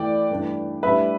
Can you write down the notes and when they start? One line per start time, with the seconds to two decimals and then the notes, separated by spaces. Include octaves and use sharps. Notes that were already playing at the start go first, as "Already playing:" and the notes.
Already playing: E2 E3 A3 D5 G5
0.30 G2 E3 A3 D4
0.83 A2 G3 D4 B4 E5